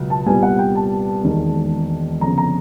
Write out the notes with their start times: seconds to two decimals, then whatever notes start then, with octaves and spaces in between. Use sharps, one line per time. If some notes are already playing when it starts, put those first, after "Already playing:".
Already playing: C#2 B2 F#3
0.10 A5
0.26 C2 A#2 G3 B3 G#5
0.43 F#5
0.59 G5
0.75 A5
1.24 E1 D#2 D#3 G#3
2.21 G1 F2 C#3 F3 A#5
2.38 A#5